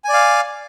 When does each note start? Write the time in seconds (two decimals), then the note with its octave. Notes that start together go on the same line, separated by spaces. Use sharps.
0.04 G#5
0.09 D5
0.13 F5